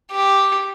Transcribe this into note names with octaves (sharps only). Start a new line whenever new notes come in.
G4